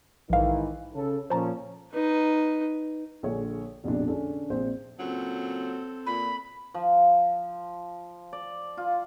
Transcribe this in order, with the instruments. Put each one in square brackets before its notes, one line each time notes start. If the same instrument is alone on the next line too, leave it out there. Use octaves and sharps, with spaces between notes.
[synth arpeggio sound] A#1 F5 [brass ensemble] G#2 D#3 E3
[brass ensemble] C#3 A4
[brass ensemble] A#2 F3 C#4 [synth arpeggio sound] C5 A5 A#5
[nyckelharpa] D#4 B4
[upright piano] A#1 D3 G#4 C#5
F1 A#1 B2 D4
D3 C#4 D4 G#4 A4
A#1 C3 C5 D5
[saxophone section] A#2 C#3 F#3 [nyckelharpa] C4 A4
[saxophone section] A#2 [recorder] B5
[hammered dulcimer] F3
D5
F4